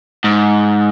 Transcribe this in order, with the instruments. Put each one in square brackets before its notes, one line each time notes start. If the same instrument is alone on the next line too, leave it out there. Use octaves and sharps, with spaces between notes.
[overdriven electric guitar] G#2